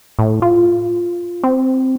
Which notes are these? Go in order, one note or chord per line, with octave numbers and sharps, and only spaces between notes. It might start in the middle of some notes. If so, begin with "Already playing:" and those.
A2
F4
C4